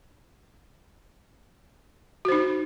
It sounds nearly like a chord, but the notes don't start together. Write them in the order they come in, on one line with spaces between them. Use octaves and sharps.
F#4 C5 D#4